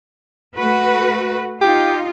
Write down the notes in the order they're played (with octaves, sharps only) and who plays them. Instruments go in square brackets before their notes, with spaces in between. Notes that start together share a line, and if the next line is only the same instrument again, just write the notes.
[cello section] A3 F#4 B4
[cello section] D#4 F4 [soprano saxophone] G4